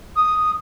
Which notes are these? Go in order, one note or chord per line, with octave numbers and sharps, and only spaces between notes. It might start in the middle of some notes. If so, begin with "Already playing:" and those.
D#6